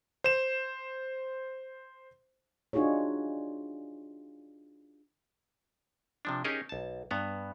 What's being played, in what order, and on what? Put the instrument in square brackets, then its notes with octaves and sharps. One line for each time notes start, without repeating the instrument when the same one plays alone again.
[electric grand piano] C5 E7
[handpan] D4 D#4 F4 F#4 G#4 C#5
[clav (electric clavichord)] C3 F3 D4
C#4 D#4 G4 G#4 A#4 D#5
B1 A5
G2 B3 A#5